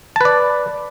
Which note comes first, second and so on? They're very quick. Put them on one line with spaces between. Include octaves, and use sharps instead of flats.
A5 B4 D5